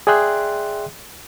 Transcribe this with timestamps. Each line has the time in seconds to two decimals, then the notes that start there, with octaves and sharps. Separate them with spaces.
0.07 G#4 D5 E5 G5 C6 F#6